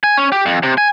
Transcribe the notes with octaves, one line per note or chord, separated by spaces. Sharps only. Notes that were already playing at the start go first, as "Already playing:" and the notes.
G#5
C#4
G4
F2
C3
G#5